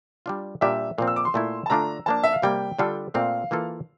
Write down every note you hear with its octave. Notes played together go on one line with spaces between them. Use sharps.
G3 D4 F4
A#2 G3 D4 G4 A#4 E5
A#2 F3 C4 F5
E6
D6
C6
A#2 A3 E4
A5
D3 A3 D4 F4 A#5
F3 A#3 D4 A5
E5
F5
C3 G3 A#3 G5
D3 G3 D4 F4 A4
A#2 A3 C4 F5
E3 A#3 F4 A4